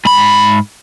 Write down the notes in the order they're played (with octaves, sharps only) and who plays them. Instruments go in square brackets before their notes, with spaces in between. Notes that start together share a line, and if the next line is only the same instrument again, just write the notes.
[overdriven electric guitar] G#2 B5